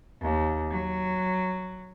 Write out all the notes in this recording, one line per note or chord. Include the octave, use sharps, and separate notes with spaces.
D#2
F#3